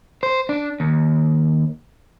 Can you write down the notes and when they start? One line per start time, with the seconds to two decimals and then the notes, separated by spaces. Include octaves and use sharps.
0.23 C5
0.49 D4
0.80 D#2